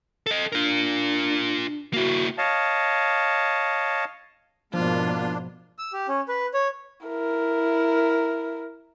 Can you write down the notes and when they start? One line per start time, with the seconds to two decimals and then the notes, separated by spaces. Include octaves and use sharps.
0.26 A4 D#5
0.52 D4 F4 A#4
1.93 A#3 E4 F#4
2.38 C#5 D#5 F5 A5
4.74 G#2 B2 F3 A#3 D4 F4
5.79 E6
5.93 G4
6.08 C#4
6.29 B4
6.54 C#5
7.06 E4 A#4